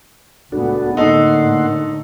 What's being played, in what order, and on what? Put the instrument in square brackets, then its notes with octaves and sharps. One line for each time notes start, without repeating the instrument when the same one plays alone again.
[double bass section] C#2 A2 B3 [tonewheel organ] D4 F#4 A4
[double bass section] A2 D3 [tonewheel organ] A#3 F#5 C6 [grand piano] D#4 A4